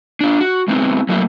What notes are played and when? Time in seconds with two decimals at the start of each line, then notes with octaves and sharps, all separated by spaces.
0.21 D4 F4
0.40 F#4
0.68 G#3 B3 C4 E4
1.09 F#3 A3 A#3 D#4 E4